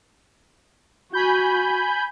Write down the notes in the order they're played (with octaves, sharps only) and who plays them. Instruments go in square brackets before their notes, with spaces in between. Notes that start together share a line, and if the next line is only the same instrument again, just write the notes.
[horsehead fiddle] F#4 [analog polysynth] G#5 B5 G6